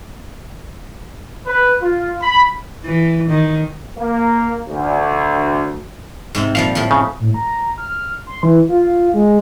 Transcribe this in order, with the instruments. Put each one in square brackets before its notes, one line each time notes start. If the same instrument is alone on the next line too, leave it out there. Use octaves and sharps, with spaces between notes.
[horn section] B4
F4
B5
[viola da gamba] E3
D#3
[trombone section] A#3
D2
[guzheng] G#2 C3 C4
[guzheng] A#2 F3 G3 [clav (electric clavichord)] F5
[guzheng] A2 F3
[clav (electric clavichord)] C#3
[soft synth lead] A2
A#5
F6
C6
E3
F4
G#3